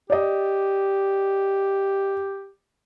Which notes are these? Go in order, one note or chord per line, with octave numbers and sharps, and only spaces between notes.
G4 D5 D#5